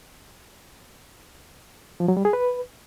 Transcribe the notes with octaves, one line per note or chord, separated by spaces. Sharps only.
F3
F#3
G3
G#4
B4